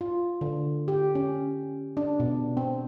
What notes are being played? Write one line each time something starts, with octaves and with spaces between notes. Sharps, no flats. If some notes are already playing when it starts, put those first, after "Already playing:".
F4
D3
G4
C#4
D4
B2
C4